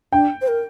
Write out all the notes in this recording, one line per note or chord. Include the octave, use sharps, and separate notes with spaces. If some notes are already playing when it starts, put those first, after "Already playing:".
D4 G5
C5
A#4